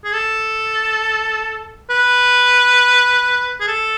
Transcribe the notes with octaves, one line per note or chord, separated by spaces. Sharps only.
G#4
A4
B4
G#4
A4